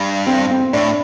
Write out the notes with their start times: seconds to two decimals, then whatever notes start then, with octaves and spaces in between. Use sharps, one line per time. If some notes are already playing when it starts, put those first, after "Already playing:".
Already playing: G2
0.27 C4
0.51 C4
0.73 A2 D4